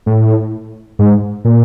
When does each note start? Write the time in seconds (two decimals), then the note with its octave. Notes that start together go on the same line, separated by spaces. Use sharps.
0.06 A2
0.99 G#2
1.45 A#2